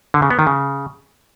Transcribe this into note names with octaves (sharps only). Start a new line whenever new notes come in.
D3
C#3
B3
D#3
C#3